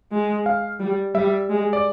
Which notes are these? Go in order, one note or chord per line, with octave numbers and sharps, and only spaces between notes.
G#3
F5
G3
G3 E5
G#3
D5